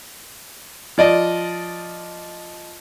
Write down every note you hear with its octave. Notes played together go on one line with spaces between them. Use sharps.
F3 D5 D#5